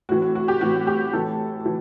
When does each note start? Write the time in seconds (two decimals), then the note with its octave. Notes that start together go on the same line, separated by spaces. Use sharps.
0.09 A2 E3 F#4
0.22 F#4
0.35 F#4
0.48 G4
0.61 A2 E3 F#4
0.87 G4
1.13 A2 E3 A4
1.66 E3